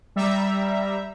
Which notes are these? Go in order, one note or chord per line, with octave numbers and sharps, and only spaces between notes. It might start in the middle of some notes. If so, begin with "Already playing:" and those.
G3 E5 A#5